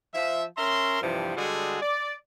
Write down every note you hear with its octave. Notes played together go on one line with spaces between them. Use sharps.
F3 E5
C#4 A#4 E5 A#5 C6
G2 C3 E3 F3
D3 G3 G#3 F#4 G#4 A4
D5